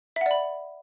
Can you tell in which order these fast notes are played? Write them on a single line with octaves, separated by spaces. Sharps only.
E5 F#5 D5 B5